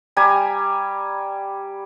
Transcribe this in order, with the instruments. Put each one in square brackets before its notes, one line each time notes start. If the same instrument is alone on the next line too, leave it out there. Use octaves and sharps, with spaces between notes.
[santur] G3 G#5 A#5